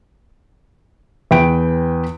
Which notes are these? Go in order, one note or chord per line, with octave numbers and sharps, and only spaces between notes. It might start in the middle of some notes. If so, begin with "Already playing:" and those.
E2 B4 G5 D7